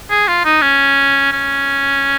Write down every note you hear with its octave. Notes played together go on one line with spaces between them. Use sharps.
G#4
F4
D#4
C#4
C#4